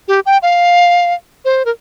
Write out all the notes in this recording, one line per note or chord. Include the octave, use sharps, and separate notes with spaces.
G4
G5
F5
C5
A#4